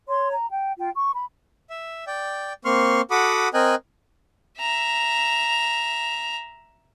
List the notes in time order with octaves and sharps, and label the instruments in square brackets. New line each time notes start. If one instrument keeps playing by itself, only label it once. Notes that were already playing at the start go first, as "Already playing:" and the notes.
[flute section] C#5 C6
A#5
G5
F4 G5
C#6
B5
[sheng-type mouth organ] E5
D5 G5
A#3 C4 C6 C#6 F6
F#4 A4 F#5 B5 D6 D#6
C4 A#4 D#5 G5 G#5 F#6
[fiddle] E5 A#5